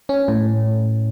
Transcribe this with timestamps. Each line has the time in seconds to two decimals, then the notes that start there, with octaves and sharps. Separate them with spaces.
0.09 C#4
0.28 A2